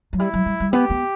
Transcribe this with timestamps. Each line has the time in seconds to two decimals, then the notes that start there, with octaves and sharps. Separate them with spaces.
0.13 F#3
0.20 G3 E4
0.34 F#3
0.46 G3
0.60 G3
0.73 B3 G4
0.90 B3